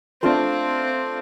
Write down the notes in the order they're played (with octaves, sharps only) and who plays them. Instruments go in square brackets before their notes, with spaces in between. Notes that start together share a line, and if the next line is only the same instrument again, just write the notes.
[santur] A3 D4 F4 C5 [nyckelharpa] C4